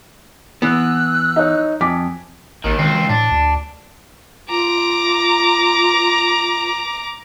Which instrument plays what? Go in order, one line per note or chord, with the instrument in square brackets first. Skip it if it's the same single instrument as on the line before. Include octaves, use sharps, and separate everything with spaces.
[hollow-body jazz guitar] E3 B3 [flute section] E6 F#6
[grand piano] D#4 C#5
[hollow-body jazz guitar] F2 [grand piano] G#5 D6 B6
[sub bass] A1 [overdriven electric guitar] D#2 D#3
[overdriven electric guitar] C#2 C4 [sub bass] D#3
[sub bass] E3
[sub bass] A2 [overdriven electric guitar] D4
[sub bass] D2
[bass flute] F4 [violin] A#5 D6